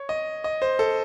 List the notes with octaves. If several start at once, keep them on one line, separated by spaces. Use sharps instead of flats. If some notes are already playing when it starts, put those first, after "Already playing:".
Already playing: C#5
D#5
D#5
C5
A4